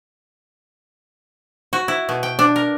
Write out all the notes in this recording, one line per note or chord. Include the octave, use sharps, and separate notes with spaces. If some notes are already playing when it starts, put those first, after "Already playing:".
F#4
E4
B2
G5
D4
A#4